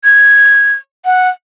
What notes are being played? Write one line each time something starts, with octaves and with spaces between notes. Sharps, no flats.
G#6
F#5